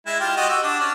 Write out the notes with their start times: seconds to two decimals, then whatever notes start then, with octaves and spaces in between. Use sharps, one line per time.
0.06 G#3 E4
0.20 F4 G4
0.37 F#4 G4 D#5
0.49 F#4 E6
0.63 D4
0.80 C#4 D4